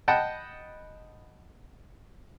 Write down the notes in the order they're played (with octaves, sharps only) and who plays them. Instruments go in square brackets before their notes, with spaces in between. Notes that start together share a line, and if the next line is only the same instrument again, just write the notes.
[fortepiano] D#5 F#5 G5 A5 B5